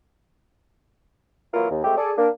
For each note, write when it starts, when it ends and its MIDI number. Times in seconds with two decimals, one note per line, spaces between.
1.54 1.68 52
1.54 1.68 54
1.54 1.68 58
1.54 1.68 64
1.54 1.68 65
1.54 1.68 70
1.71 1.83 39
1.84 1.96 56
1.84 1.96 57
1.84 1.96 60
1.84 1.96 67
1.98 2.13 68
1.98 2.13 69
1.98 2.13 74
2.18 2.29 58
2.18 2.29 62